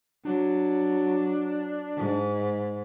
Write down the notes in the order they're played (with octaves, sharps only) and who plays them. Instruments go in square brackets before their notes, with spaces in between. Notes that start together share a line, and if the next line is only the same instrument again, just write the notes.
[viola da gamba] F#3 [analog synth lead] D4
[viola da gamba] G#2